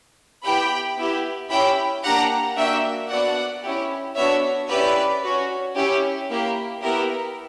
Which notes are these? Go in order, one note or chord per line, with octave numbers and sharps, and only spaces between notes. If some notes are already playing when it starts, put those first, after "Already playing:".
B3 E4 G4 G5 B5
B3 E4 G4
C#4 E4 G4 G5 B5
A#3 D4 G4 F#5 A#5
A#3 D4 F#4 E5 G5
B3 D4 F#4 D5 F#5
C#4 E4 G4
B3 D4 F#4 C#5 E5
C#4 E4 G4 B4 D5
C#4 F#4
C#4 E4 G4
A#3 E4 G4
B3 E4 G4 A#4